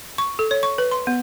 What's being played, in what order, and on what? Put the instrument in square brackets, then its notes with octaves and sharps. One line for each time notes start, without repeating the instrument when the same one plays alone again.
[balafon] C#6
A4
C#5
C#6
B4
C6
B3